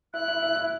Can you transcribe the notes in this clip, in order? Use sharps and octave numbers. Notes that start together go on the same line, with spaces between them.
E4 F#6
E4
E4
E4